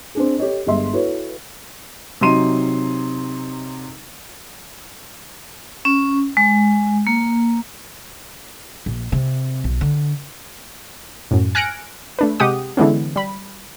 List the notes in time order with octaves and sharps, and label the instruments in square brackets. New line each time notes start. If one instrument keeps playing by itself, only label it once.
[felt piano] C4 D4 G#4
G4 A4 C#5 D#5
G1 G3 G#3 D#5 E5 C6
E4 F#4 A4 B4 C#5
[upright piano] C3 F#3 D#4 C6 D#7
[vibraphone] C#4
G#3
A#3
[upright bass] A#1
C3
B1
D3
[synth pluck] F#2 A2
G#5 F6 F#6 A#6 C#7 D7
A3 D4 B4
C3 G#3 G4 F#5 D#6
D3 E3 G#3 B3 C#4
G3 B5